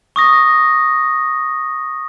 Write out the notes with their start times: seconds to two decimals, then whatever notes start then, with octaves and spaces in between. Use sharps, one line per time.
0.16 C#6 D#6 A#6